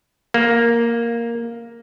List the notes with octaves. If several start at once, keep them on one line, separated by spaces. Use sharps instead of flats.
A#3